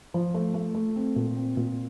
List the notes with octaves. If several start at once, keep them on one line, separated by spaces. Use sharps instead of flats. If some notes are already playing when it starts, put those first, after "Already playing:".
F3
A3
A3
A3
C4
A#2
C4
A#2